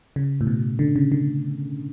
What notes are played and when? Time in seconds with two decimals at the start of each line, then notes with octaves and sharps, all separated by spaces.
0.16 C#3
0.41 A2
0.47 B2
0.79 D3
0.96 C#3
1.12 D3